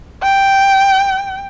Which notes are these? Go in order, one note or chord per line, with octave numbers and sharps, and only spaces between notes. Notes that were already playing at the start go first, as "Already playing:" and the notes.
G5